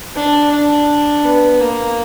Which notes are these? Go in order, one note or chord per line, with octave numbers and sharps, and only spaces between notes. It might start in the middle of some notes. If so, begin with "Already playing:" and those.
D4
D4
B3
A#3